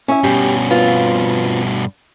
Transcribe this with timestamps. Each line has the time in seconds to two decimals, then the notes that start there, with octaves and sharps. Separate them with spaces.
0.08 C#4 E4 E5
0.24 G2 B2 G4
0.70 C4 F4 B4